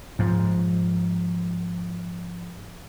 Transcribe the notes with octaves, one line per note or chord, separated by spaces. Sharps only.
G#2 F3